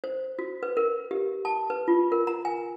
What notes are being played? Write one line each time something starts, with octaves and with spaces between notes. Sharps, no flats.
C5
F#4
B4
A#4
G4
A5
B4
F4
A#4
A#5
G#5